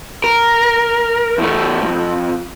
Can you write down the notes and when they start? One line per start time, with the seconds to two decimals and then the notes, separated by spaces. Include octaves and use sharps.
0.24 A#4
1.38 E2 A3
1.82 B1 F2